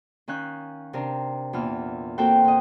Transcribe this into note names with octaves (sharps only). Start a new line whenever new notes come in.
D#3 C#4 F5 F#6 G6
C3 C4 D4 A#4
E2 A#2 E4 F4 F6
A#3 C4 F#4 A4 C5 G5
A#2 D#5